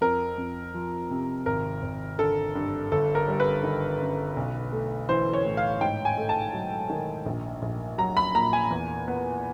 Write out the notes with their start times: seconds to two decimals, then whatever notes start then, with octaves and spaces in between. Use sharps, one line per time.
0.01 F2 A#4
0.38 F2
0.75 F3
1.10 C3
1.46 G#1 A#4
1.83 G#1
2.18 D3 A4
2.55 G2
2.91 G1 A4
3.15 A#4
3.28 G3
3.40 B4
3.63 D#3
4.00 F#2
4.37 B1
4.72 A3
5.09 E3 C5
5.33 C#5
5.45 A2
5.57 F5
5.81 G#2 G5
6.05 G#5
6.17 A3
6.29 A5
6.53 F#3
6.90 D#3
7.26 A#1
7.62 A#1
7.98 F#3 A#5
8.17 B5
8.35 A#2 A#5
8.53 G#5
8.71 E2
9.08 B3